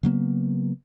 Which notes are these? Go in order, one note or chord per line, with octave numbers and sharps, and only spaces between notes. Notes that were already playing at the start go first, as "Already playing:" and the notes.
C#3 F#3 A#3 B3